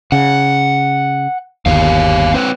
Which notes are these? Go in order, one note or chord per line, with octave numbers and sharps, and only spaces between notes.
C#3 F#5
G1 D#2 G4 C#5 F5
C4 B4 C#5